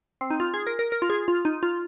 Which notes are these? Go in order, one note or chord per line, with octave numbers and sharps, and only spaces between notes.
C4
D#4
F4
G#4
A#4
A#4
A#4
F4
G#4
F4
D#4
F4